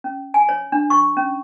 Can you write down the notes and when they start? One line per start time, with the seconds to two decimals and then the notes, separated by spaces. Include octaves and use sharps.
0.04 C#4
0.34 G#5
0.49 C#5
0.72 D4
0.90 C#6
1.17 C#4